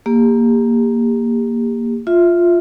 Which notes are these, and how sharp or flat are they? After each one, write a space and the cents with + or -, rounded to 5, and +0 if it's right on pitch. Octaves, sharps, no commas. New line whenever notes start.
A#3 +0 G4 +35
F4 +0 E5 +0